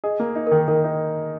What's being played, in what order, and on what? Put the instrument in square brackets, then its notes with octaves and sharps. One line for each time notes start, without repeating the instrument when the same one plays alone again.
[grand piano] G#4 [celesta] D#5
[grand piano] A#3
D#4
[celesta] A#4
[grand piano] D#3
[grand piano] D#3 [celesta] A#4
[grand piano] D#4